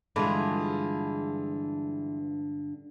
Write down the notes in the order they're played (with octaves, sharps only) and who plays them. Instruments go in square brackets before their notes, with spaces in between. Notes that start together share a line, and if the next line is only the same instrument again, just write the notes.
[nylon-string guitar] G2 D3 G#3 [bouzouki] E3 F4 G#4